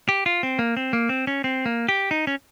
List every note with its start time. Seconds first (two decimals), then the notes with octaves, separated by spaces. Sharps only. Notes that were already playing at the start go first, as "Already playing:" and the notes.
0.09 G4
0.26 F4
0.43 C4
0.59 A#3
0.77 C4
0.93 A#3
1.09 C4
1.27 C#4
1.44 C4
1.66 A#3
1.89 G4
2.11 D#4
2.27 C#4